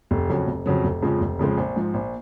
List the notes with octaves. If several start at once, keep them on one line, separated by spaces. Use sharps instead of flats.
F1
F2 C#3 F#3
F1
F2 C#3 F#3
F1
F2 C#3 F3 G#3
F1
F2 C#3 F3 G#3
A#1
G#2 F3
A#1